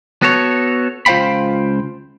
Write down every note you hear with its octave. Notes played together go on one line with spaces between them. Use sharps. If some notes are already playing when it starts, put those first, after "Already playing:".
B3 F#4 A4 C#5
C#2 F4 C5 F5 G5 B5